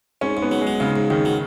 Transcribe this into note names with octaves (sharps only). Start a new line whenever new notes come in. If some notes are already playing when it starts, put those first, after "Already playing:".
G#2 C#4
G#2
B3
F#3
G#3
F#3
G#2 C#3
G#2
G#2 D#3
F#3